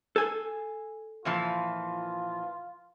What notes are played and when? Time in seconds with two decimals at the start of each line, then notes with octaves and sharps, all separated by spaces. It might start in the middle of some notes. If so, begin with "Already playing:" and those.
0.16 A4 G#5
1.25 A#2 E3 F3 F4